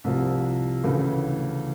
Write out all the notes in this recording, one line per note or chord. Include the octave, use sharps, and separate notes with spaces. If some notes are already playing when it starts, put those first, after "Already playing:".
C2 C3 F3
D2 C#3 E3